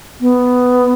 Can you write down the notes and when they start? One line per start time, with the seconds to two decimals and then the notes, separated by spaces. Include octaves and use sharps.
0.21 B3